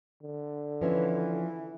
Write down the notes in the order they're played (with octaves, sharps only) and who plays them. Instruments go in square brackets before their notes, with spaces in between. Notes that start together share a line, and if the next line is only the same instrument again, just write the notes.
[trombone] D3
[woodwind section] E3 [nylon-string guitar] F3 C#4 E4